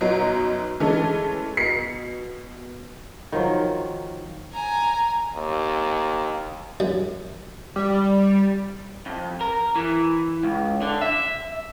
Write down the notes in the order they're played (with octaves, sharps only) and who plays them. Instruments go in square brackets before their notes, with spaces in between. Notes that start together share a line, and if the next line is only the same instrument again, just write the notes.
[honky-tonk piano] F#2 B2 F#3 D#4
E3 G#3 A3 C#4 A4
B2 C7 C#7
[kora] D#3 F3 F#3
[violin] G#5 A#5
[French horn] D#2
[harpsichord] F#2
[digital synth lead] G3
[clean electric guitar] F2
A#4
E3
C#2
D3
E5